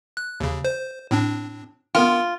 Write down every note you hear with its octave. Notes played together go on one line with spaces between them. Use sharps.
F#6
D#2 C#3
C5
A2 C4 D4
B3 F4 A#4 G5